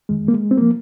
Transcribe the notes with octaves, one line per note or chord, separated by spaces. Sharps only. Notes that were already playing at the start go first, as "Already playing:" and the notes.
F2 D#3 G#3
A#3
G#3
C4
F3 A#3